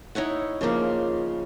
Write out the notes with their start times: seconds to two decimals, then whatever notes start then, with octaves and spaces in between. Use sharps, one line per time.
0.15 D#4 E4 C#5 F#5
0.61 C#3 F3 A#3 D#4